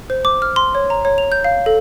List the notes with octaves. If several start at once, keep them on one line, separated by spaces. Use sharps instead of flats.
C5
D6
F6
C6
C#5
A#5
C#5
F7
G6
F5
A4